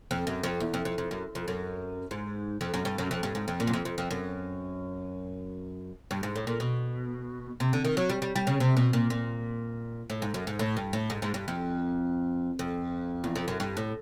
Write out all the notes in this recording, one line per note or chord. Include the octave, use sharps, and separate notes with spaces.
F2
F#2
F2
E2
F2
F2
F2
F#2
F2
F#2
G#2
F2
F#2
G2
F#2
F2
G2
G#2
F2
A#2
F#2
F2
F2
F2
F#2
G2
G#2
A2
A#2
B2
C3
D3
D#3
F#3
G3
G3
G3
C#3
C3
B2
A#2
A#2
A2
G#2
F#2
G#2
A2
G2
A2
G#2
G#2
G2
F2
F2
E2
F2
F#2
G2
A2